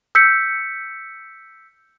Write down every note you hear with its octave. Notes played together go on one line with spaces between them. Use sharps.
E6 G6 B6 C#7